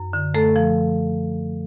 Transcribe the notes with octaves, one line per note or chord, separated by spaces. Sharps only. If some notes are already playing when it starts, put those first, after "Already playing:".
Already playing: F#2
D3
F#2 A3 A4
F3